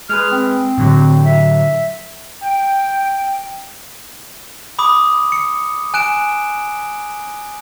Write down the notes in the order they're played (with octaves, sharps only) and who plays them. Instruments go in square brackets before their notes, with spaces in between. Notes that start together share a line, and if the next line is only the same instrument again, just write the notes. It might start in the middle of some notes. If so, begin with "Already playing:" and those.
[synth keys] G#3 G#4 B4 [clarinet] F6
[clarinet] C4
[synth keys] A2 D3 F#3
[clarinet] E5
[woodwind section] G5
[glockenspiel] B5 D6 D#6
C#7
G#5 F#6 D7 E7